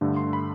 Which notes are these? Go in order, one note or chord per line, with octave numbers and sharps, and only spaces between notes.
G2 D3 A3
C6
B5